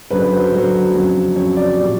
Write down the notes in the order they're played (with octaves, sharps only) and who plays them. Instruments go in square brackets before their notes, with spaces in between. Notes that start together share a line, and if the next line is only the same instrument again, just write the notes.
[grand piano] F#2 D3 F#3 B4
B4
C5
F#2 D3 F#3 C5
F2 C#3 F#3
F2 C#3 F#3 C#5
D5
A#2 G3